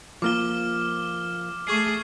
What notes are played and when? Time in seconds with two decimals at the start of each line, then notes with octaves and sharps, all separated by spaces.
0.22 F3 A#3 F4 D6 F6 G7
1.67 A3 G#4 C#6 G#6 C7